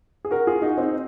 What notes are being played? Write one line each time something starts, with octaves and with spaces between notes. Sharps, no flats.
G#4
F#4 A#4
F4 G#4
D#4 F#4
C4 D#4